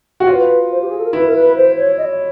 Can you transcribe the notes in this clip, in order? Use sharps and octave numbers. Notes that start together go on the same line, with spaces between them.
F#4
F4 C#5
B4
C5
G4
G#4
A4
A#4
E4 B4
A#4
B4
C5
C#5
D#5
C#5